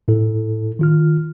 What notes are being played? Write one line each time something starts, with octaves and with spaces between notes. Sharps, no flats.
A2 E4 A4
D#3 F4 F6